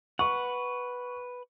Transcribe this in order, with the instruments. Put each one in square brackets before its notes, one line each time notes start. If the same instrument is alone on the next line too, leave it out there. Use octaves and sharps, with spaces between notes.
[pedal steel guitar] B4 F#5 [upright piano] C#6